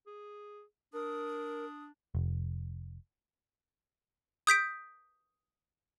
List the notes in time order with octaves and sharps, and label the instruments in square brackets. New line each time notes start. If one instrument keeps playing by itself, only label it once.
[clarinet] G#4
[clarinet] D4 [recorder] A#4 [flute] D#6
[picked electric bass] F1
[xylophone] D#6 G6 B6 D7